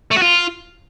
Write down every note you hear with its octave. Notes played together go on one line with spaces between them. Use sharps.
A3
F#4
F4